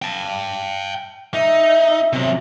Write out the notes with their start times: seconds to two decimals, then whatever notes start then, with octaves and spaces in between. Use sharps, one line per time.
0.02 G5 A5
1.34 D#4 E5
2.13 C3 F#3